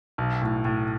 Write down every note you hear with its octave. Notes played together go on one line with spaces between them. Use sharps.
B1
A2
A2